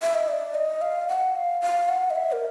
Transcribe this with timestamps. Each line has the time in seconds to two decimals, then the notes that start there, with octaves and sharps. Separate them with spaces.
0.02 E5
0.15 D#5
0.28 D5
0.55 D#5
0.81 F5
1.09 F#5
1.35 F5
1.62 F5
1.89 F#5
2.10 D#5
2.15 E5
2.32 A#4